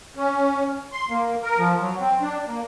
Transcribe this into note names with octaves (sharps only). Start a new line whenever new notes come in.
C#4
C6
A#3
A#4
F3
F#3
C4
D4
A#3